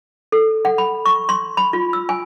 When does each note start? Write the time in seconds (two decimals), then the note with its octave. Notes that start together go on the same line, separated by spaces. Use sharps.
0.32 A4
0.65 F#5
0.78 B5
1.05 C#6
1.29 C6
1.57 B5
1.73 F4
1.93 E6
2.09 G#5